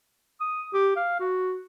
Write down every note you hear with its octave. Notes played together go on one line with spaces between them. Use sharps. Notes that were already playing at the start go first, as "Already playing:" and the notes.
D#6
G4
F5
F#4